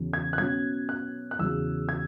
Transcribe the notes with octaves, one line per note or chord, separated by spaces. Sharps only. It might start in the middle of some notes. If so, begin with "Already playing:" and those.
Already playing: E2 C#3 F#3 C#4
G#6
F#6
B2 F#3 C#4 G#6
F#6
F#6
E2 C#3 F#3 E6
G#6